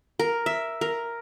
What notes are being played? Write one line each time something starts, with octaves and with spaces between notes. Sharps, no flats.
A#4
E5
A#4